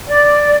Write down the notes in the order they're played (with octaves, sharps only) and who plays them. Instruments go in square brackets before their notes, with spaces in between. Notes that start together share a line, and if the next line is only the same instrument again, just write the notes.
[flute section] D5